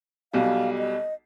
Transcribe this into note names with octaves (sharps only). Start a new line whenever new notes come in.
B1 B2 G3 F5
D#5